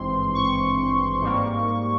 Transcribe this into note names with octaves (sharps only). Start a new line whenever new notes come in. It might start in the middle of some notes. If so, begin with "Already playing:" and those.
Already playing: G#1 G2 E3 G#3 C4 C6
C#6
G#2 G3 A#3